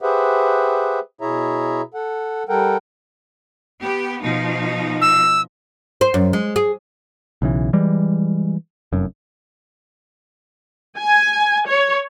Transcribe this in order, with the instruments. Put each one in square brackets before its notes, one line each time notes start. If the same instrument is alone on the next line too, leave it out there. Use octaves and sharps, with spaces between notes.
[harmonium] G4 G#4 B4 C5 E5 F#5
B2 E4 G#4 C#5 E5 A#5
A4 F#5
G3 A4 A#4 F#5 G5
[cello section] B3 G4
B2 F3 D#4
[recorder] E6
[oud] C5
F#2
G#3
G#4
[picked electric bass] B1 C#3 E3
E3 G3 G#3
F1 F#2
[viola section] G#5
C#5